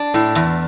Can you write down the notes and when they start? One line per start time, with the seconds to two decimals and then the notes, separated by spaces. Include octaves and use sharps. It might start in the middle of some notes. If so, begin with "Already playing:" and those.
Already playing: D4
0.14 A2
0.35 E2